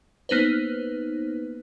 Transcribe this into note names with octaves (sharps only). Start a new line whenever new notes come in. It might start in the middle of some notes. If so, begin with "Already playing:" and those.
A#3 B3 D#4 B4 C5